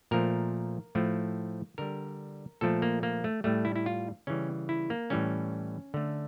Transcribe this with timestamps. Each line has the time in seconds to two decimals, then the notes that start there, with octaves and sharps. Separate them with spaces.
0.11 A#2 F3 A3 A#4
0.95 A2 F3 A3
1.78 D3 G3 A#4
2.61 A#2 F3 A3 A4
2.82 A#3
3.03 A#3
3.24 A3
3.44 A2 G3 A3
3.65 E4
3.76 E4
3.86 F4
4.27 C#3 E3 G3 C#4
4.69 E4
4.90 A#3
5.10 A2 E3 G3 C#4
5.94 D3 A3